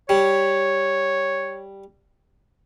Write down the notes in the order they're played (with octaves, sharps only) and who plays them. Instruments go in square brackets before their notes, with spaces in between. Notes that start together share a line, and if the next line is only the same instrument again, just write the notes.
[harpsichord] G3 [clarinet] C#5